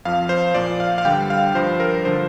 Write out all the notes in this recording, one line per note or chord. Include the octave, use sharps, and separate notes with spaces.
F2 F3 F5
C5
A#2 F3 D5
F5
F5
G2 D3 G3 G5
F5
G2 F3 C5
A#4
D3 F3 C5